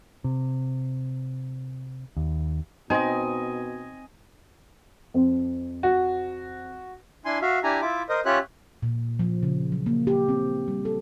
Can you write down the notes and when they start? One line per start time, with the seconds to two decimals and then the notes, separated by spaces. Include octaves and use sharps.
0.24 C3
2.17 D#2
2.90 B2 C4 D#4 D#5 G#5
5.14 F2 C4
5.83 F#4
7.25 D4 E4 G#5 C6
7.42 F#4 E5 F5
7.64 D4 E4 G4 G#5 A#5
7.82 E4 F4 E5 D6
8.09 A#4 C5 D#5
8.25 C#4 F4 G4 C#5 E5 F#6
8.83 A#2
9.19 F3
9.43 C#3
9.72 F#3
9.86 A#3
10.07 G4
10.28 C4
10.68 G3
10.85 A4